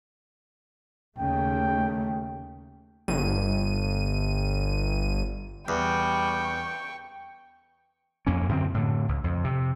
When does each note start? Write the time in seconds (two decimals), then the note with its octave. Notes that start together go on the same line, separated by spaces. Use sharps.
1.19 D#2 C#3 A3 G5
3.08 G1 D#7
5.68 E2 G3 G5 C#6
8.27 F2 A#3 C#4
8.49 F#2 D3 A#3 C4
8.74 A2 D3
9.08 C#2
9.24 F2
9.44 C3